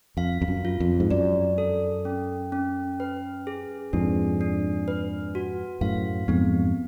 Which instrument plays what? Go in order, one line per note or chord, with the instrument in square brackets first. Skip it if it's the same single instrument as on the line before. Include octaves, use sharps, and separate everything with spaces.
[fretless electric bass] F2 [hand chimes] F5
[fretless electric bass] F2
F#2
[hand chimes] F4
[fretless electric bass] F2
G#2
[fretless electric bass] F#2 [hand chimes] D5
[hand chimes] A4
C#4
C#4
B4
G#4
[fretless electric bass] F2 G#2 [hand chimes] D4
[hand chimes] D4
B4
F#4
[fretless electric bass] F#2 A2 [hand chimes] F5
[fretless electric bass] F2 G#2 [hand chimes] B3